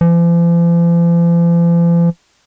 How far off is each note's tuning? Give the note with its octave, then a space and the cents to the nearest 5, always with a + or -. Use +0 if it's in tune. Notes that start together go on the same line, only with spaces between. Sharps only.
F3 -45